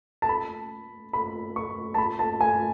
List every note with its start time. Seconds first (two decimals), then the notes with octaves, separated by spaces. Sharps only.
0.22 A5
0.29 B5
1.13 B5
1.56 C#6
1.94 A5
1.98 B5
2.19 A5
2.41 G#5